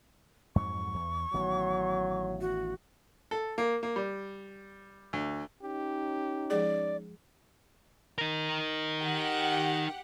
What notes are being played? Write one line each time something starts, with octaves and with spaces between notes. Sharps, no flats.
F2 G#2 F#3 C#6
E2
A1 D#3 F#3 B3
F#4
A4
A#3
A#3
G3
D2
C#4 D#4 G4
F3 G#3 G#4 D5
D#4 A#4
G4 F#5